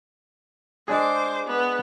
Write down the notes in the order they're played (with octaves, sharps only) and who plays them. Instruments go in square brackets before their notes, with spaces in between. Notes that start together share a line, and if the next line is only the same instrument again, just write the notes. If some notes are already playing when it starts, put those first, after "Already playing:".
[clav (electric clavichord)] G#3 D4 G#4 [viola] C5 D6
[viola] B3